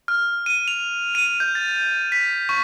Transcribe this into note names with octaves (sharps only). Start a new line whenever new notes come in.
F6
D#7
F7
D#7
G6
A6
B6
C#6